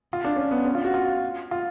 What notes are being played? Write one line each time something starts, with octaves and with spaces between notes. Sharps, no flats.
F4
D4
C#4
B3
C#4
F4
F#4
F4
F4